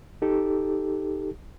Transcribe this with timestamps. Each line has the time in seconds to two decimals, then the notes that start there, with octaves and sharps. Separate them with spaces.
0.22 D#4 G4 A4